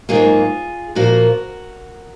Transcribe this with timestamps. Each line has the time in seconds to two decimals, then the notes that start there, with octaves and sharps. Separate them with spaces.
0.09 G#2 F#3 A#3 F4 G#4
0.95 A#2 F3 A#3 F#4 A#4